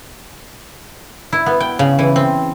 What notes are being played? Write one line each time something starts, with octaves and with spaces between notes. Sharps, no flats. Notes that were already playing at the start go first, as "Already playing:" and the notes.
E4
B3
G5
C#3
E3
C4